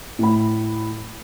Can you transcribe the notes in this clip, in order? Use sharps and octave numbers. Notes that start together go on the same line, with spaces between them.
A2 B5